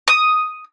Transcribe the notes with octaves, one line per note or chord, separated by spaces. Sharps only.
D#6